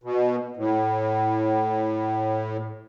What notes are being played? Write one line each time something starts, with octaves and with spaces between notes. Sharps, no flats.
B2
A2